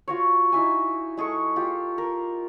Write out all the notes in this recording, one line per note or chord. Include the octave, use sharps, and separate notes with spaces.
F4 F#4 C#5
D#4 E4 E5 G#5
G#3 G#4 A4 C#6
F4 G4
A#4